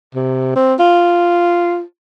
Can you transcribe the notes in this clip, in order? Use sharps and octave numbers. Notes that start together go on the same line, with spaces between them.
C3
C4
F4